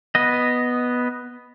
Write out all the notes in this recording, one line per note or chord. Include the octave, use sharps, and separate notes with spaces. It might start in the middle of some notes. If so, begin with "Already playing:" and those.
B3 D#5